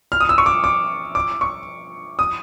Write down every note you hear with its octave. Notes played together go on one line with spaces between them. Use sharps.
F6
D#6
E6
C#6
D6
D6
D6
C#6
D#6